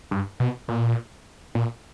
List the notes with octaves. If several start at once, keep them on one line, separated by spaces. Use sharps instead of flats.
G2
B2
A#2
A#2